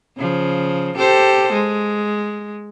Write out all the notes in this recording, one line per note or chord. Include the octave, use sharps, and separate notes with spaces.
C#3 F3
G4 A4 C5
G#3